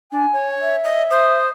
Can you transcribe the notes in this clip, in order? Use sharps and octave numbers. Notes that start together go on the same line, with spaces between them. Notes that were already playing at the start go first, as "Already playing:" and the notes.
D4 G#5
C#5
E5
D#5
C5 D#6